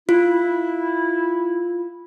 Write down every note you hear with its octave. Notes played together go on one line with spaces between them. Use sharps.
E4 F4